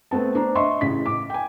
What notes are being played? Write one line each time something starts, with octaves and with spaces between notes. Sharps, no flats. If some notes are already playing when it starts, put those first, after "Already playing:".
A3 B3 C4 A5
D4 C5 A#5
D#5 E5 C6 C#6
A1 C#3 B6
D6
G5 G#5